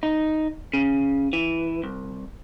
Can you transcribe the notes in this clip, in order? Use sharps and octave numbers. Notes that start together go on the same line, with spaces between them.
D#4
C#3
E3
C2